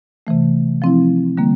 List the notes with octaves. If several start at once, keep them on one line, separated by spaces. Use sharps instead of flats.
C3 E3 A3
F3 C4 E4
D3 G3 A#3